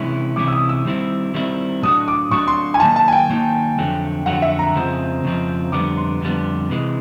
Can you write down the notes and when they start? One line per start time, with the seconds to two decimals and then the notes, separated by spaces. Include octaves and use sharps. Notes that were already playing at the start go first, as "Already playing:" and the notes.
Already playing: C3 E3 G#3 C#4 E4 C#6
0.36 C3 E3 G#3 C#4 E4 D6
0.48 E6
0.52 D#6
0.69 E6
0.85 D#3 G3 C4 E4
1.34 D#3 G3 C4 E4
1.82 A2 F#3 A3 D4 F#4 D#6
2.08 D6
2.31 A2 F#3 A3 D4 F#4 C#6
2.48 C6
2.74 G#5
2.80 D#3 F#3 A#3 D#4 A5
2.96 A5
3.08 G#5
3.12 G5
3.30 D#3 F#3 A#3 D#4
3.78 F2 D3 F#3 A3
4.26 F2 D3 F#3 A3 F#5
4.42 E5
4.59 A#5
4.75 F2 C#3 F3 G#3 C4
5.24 F2 C#3 F3 G#3 C4
5.72 F2 D3 G3 B3 D6
5.97 C6
6.21 F2 D3 G3 B3
6.70 C3 E3 G#3